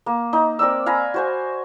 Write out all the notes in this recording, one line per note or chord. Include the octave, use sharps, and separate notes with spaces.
A#3
D#4
C4 A#4 D5 E6
F5 G#5 A#5 B5
F#4 C5 G#5